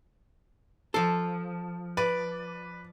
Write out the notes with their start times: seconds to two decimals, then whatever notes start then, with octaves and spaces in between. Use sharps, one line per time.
0.94 F3 A4 C6
1.97 B4 D5